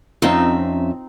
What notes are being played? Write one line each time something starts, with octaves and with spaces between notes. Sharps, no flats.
F2 C4 C#4 D#4 F4 E5